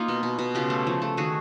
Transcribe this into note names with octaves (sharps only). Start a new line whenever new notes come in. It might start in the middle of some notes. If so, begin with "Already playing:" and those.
Already playing: A#3 D#4 F4
B2
B2
B2
C#3 F4 G4
A3
F3
A3
D#3 F#4 G#4